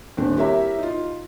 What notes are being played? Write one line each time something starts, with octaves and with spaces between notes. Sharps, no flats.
D#1 C4 D4
E4 G4 A#4 C#5 E5 A#5
D#4 F4